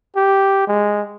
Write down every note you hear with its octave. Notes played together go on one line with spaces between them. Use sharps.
G4
G#3